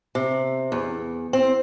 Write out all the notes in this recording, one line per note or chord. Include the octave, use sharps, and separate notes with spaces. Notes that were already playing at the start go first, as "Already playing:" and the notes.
C3
E2
C4